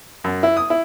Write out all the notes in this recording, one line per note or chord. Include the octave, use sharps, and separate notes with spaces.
F#2
E4
D#6
E4